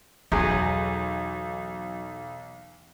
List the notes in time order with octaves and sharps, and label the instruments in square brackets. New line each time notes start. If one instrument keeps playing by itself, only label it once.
[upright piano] B1 [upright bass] E2 [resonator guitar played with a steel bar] F#3 G#4